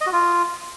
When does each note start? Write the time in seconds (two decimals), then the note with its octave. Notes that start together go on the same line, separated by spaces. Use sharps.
0.01 D#5
0.07 F#4
0.12 F4